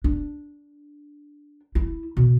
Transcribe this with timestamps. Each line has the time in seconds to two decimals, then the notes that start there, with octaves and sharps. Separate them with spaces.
0.04 D4
1.75 E4
2.17 B2